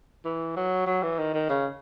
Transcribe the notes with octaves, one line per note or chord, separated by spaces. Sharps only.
E3
F#3
F#3
E3
D#3
D#3
C#3